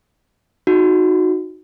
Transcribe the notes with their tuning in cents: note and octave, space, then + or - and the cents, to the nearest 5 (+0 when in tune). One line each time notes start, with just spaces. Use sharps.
D#4 +0 F#4 -15